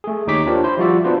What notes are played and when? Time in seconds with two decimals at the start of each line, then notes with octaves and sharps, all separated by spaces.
0.04 A3 G#4
0.27 D#2 D#4 G4 C#5 D6 B6
0.46 D4 F4 G4 A#4 C5 C#5
0.64 E4 C5 C6
0.78 F3 G3 F4 F#4 D5 E5
1.04 B3 D4 F4 F#4 B4 C5